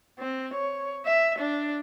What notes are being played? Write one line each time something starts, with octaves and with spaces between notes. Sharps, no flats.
C4
C#5
E5
D4